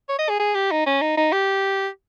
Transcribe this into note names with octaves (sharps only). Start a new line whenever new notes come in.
C#5
D#5
G#4
G#4
G4
D#4
C#4
D#4
D#4
G4